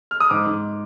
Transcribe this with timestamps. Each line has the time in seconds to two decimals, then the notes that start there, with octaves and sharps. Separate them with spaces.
0.11 F6
0.20 D#6
0.30 G#2 D6
0.46 G#2